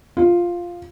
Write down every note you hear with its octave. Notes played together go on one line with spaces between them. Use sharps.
F4